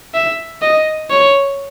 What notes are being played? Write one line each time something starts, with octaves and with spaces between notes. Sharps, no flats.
E5
D#5
C#5